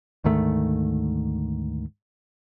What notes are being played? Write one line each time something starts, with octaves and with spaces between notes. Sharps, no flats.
D2 G#2 D#3 A3